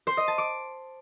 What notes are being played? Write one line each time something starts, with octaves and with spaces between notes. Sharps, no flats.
C5
D#5
A5
D6